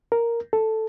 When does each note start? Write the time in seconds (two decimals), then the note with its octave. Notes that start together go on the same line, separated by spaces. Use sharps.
0.12 A#4
0.53 A4